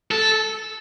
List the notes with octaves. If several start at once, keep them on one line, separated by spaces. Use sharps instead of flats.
A4